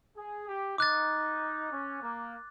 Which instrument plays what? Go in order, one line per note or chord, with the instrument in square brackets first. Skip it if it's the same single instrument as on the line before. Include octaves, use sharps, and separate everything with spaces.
[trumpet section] G#4
G4
[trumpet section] D#4 [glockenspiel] D6 F#6 A6
[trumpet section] C#4
A#3